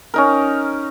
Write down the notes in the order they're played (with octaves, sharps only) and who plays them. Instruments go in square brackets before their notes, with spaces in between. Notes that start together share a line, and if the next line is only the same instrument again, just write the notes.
[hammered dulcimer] C#4 D#4 A#4